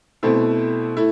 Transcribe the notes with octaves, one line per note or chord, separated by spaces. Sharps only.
B2 A3 C4 E4
A3 E4